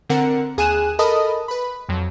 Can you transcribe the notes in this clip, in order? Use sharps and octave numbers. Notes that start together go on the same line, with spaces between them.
D3 C4 A#4 F#5 A#5 C#7
D#2 G#4 G#5 F#6 D#7 E7
A4 A#4 D#5 A5 B5 D#6
B4 B5
F2 F#3